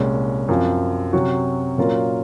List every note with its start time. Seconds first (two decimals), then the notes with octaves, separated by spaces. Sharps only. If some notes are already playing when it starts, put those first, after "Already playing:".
Already playing: C2 A#2 G#3 C#4
0.48 F#2 F3 C4 F4
1.13 C3 F#3 C#4 F#4
1.78 A#2 F#3 C#4 F4 A#4